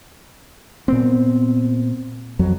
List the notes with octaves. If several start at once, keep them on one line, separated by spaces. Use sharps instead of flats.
A#2 B3 C4
F2 F#3